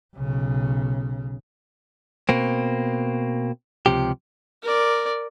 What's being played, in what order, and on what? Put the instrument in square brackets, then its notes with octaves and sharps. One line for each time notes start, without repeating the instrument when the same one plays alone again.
[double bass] B1 C#3
[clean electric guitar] B2 A#3 C4
C#2 C3 F3 G4
[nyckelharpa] A#4 D5